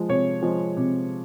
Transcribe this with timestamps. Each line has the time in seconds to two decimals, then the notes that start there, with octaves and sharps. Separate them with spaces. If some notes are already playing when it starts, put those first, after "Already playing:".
Already playing: F3 G#3
0.09 C3 C#5
0.43 F3 G#3
0.77 C3